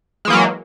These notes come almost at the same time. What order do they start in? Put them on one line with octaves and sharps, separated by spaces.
G#3 E3 A#3 F#3